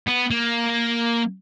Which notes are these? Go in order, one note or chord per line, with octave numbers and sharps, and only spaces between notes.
B3
A#3